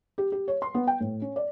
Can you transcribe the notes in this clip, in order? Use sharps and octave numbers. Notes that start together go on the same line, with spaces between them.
G4
G4
C#5
C6
B3
G5
A2
C#4
D5